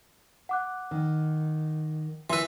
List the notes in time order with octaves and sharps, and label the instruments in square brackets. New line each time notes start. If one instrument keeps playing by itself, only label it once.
[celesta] F#5 D6 F#6
[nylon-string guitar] D#3
[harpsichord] E3 B4 [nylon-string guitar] G#5 [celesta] C6 E6